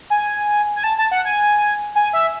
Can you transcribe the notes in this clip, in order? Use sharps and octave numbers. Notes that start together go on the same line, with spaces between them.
G#5
G#5
A5
A5
F#5
G#5
G#5
E5